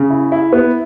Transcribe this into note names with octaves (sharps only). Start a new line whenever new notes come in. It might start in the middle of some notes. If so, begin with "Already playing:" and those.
Already playing: C#3
E4
E4
B3